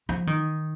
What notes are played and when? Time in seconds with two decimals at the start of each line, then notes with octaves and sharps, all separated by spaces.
0.09 F3
0.27 D#3